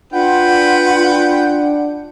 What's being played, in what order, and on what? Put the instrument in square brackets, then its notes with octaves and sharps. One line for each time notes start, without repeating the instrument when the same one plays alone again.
[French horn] D4 [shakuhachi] F4 [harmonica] B4 G5 [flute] F#5